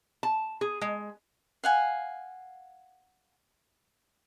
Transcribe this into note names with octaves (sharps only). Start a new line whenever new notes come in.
A5
G#4
G#3
F5 F#5 G#5